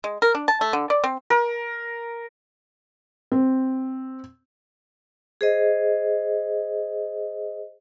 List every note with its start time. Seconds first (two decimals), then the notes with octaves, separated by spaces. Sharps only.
0.04 G#3
0.22 A#4
0.35 D4
0.48 A5
0.61 A3
0.73 D3
0.90 D5
1.04 C4
1.30 A#4
3.32 C4
5.41 G#4 C5 D#5